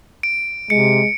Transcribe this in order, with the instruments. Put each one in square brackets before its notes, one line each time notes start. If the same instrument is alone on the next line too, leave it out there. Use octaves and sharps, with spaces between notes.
[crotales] D7
[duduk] C3 [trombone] G#3 [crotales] C#7